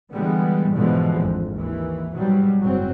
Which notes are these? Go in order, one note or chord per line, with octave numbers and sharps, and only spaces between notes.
D3 E3 G3 G#3 B3
G#2 B2 D3 E3 F3 G#3
G#1 F2
D#2 E3
G#2 B2 F#3 G3
F#1 G#2 F#3 C4